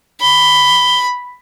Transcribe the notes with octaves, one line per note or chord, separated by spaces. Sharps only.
B5 G7